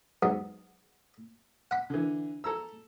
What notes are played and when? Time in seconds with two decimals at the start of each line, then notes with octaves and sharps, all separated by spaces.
0.23 G#2 F#3 B3
1.71 F#5 B5
1.90 D3 E3
2.44 A4 A#5 E6